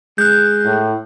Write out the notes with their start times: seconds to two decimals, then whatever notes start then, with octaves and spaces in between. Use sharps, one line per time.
0.18 G#3 F#6 G6
0.65 A2